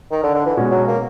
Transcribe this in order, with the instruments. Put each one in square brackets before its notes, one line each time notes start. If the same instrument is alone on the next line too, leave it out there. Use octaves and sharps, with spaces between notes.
[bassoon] D#3
D3
D3
E3
[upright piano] B2 G#3 C#4 F#4
[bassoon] F#3
A#3